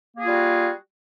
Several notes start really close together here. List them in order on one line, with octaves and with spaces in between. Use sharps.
A#3 G#4 F4 G3 F#4